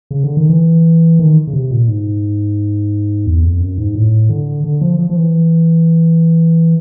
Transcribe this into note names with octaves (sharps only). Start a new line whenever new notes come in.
C#3
D3
D#3
E3
D#3
C#3
C3
A#2
G#2
E2
F2
F#2
G#2
A2
D3
D3
F3
F3
F3
E3